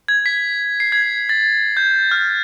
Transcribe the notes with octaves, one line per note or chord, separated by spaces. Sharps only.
G#6
B6
C7
G#6
A6
G6
F6